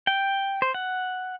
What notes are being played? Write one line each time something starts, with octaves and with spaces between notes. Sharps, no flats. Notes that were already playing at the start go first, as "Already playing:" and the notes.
G5
C5
F#5